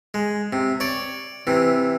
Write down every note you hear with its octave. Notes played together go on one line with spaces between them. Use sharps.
G#3
C3
C#5 D5
C3 E3